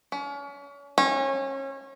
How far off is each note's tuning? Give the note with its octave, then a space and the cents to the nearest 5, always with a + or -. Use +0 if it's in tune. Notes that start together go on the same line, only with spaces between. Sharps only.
C#4 +35
C#4 -30